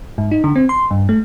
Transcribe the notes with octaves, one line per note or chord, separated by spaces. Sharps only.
G#2
D#4
D3
C4
C6
G2
A3